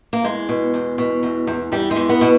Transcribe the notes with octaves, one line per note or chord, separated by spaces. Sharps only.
A#3
E2 G#3
B2
E2
B2
E2
E2
E2 G3
G#3
E2
B3
B2